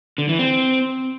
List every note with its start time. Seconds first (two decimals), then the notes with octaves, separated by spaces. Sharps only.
0.18 D3
0.29 E3
0.39 C4